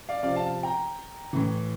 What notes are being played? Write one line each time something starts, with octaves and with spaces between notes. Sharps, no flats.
D5 F5
C3 F3 D5 F5
F5 A5
G5 A#5
A2 E3